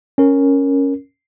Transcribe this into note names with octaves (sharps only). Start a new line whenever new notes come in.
C#4 A#4